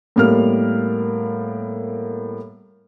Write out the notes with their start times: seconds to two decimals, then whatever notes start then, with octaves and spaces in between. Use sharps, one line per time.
0.16 A2 G3 A#3 B3 F6